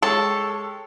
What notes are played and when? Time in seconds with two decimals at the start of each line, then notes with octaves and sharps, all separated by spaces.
0.02 G#3 G4 A4 C#5